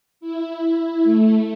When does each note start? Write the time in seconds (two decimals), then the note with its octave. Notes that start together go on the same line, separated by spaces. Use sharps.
0.21 E4
1.04 A3